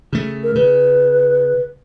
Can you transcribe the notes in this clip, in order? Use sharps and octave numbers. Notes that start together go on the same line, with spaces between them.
C#3 A3
A#4
C#3 B4